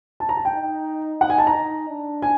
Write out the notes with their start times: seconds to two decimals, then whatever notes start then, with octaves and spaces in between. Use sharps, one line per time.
0.20 A5
0.29 A#5
0.37 A5
0.45 G5
0.54 D#4
1.21 D#4 F#5
1.30 G#5
1.38 A5
1.47 A#5
1.55 D#4
1.89 D4
2.22 G#5